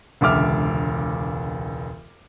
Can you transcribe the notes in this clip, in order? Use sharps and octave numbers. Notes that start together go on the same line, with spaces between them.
E1 C#2 D3 E5 D6 F6